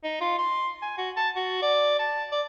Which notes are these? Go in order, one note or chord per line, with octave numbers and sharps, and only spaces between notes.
D#4
F4
C6
G#5
F#4
A5
F#4
D5
A5
D5